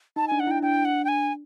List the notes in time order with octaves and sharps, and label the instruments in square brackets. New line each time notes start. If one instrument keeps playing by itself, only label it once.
[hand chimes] D#4 [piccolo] A5
[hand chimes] D4 [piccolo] G#5
[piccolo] F#5
[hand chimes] E4 [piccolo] G5
[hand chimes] D4 [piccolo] G5
[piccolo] F#5
G5
G#5